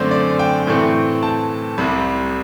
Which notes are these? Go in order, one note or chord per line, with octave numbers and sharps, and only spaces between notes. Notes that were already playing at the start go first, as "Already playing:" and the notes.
Already playing: F#2 D3 A3 C4 C5 D5
D5
G5
A2 E3 A3 C4
A5
C2 C3 G3